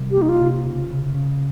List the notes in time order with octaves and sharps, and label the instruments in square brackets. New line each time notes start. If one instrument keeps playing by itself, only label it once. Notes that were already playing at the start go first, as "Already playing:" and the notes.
Already playing: [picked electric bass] C3 G3
[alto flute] G4
[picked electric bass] A#3
[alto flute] D#4
F4
[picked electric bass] C3
C#3
C#3
C#3